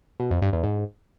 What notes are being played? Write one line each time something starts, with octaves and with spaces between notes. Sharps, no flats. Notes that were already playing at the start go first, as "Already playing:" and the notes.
B2
F2
G2
E2
G#2